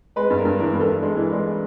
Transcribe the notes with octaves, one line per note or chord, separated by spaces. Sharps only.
G#3 B4
G2
A#4
G2
E3 A#4
G2
A4
G2
G#3
E3
G#3